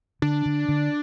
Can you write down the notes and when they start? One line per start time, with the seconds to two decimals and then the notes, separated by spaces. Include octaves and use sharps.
0.22 D3 D4
0.46 D3
0.68 D3